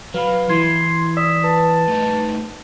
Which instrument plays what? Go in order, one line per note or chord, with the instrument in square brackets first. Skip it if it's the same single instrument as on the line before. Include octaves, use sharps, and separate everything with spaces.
[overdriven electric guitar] F#3 [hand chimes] B4 B5 [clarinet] F5
[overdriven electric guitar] E3 [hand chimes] E4 G#6 [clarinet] C6
[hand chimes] D5 D#6 B6 [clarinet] E6
[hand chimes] B4 [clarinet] A5
[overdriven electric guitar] A2 D#4